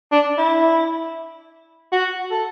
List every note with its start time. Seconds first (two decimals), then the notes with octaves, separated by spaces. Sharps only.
0.12 D4
0.38 E4
1.92 F#4
2.31 A4